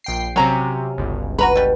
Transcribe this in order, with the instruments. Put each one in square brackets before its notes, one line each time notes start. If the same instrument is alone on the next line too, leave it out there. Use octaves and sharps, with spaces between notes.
[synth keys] A#1 G5 C7
[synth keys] C3 F#3 [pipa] C#4 A#5
[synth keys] G1 C#2
[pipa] F#4 A#5 B5 [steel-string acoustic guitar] B4
[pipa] B2 G3